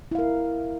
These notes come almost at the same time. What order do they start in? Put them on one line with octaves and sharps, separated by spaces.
E4 F5 A#4